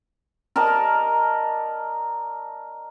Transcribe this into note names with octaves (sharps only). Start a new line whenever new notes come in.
A#4 D5 D#5 A5